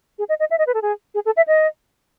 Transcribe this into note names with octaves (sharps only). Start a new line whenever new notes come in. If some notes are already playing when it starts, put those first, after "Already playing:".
G#4
D#5
D#5
E5
D#5
B4
A4
G#4
G#4
A4
E5
D#5